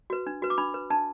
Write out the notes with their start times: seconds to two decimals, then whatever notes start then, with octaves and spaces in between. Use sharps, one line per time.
0.10 F#4 B4
0.27 D4
0.42 F#4 B4
0.50 D6
0.58 D4 B5
0.74 B4
0.90 D4 A5